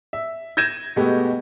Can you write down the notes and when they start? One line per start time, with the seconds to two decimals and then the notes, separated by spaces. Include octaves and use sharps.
0.13 E5
0.57 G6 G#6 A#6 D#7 E7
0.96 B2 G#3 A3 B3 G4